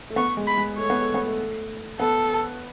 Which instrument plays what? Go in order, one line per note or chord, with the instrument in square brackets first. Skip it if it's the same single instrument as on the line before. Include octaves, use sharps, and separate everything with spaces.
[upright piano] A3
[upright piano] B3 [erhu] C#6
[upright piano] G#3
[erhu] B5
[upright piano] G#3
[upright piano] A3 [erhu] C#5
[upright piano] B3
A3
B3
A3
[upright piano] B3 [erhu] A4